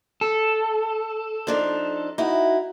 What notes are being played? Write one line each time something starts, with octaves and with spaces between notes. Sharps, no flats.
A4
F3 D4 D#4
D#4 E4 F#4